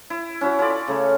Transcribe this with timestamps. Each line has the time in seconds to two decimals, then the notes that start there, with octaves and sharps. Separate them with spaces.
0.10 E4
0.41 C#4 E4 F#4
0.59 C#4 F4 A4 D5
0.88 C#3 A3